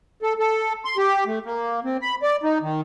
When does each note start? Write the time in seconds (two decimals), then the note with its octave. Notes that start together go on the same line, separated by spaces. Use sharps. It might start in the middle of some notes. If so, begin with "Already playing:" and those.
0.22 A4
0.39 A4
0.85 C6
0.97 G4
1.27 A3
1.46 A#3
1.85 C4
2.02 B5
2.23 D5
2.43 D#4
2.62 D#3